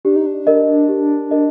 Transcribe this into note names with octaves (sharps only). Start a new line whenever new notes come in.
D4 G4
D#4
D4
A#4 D#5
G4
A#4 D#5